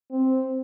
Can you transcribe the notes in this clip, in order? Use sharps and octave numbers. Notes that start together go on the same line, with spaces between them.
C4